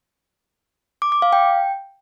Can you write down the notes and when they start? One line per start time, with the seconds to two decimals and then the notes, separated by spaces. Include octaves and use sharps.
1.02 D6
1.12 D6
1.22 F5
1.33 G5